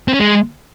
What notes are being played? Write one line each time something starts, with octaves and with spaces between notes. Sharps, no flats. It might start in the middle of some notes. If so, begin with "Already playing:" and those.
C4
C#4
G#3